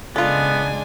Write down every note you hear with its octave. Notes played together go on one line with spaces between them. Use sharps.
C#3 G#3 B3 D4 F4 A4 G#5